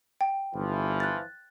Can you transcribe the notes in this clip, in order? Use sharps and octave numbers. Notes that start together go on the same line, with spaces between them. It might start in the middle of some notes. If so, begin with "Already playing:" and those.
G5
G1 E3 F3
F#6 A6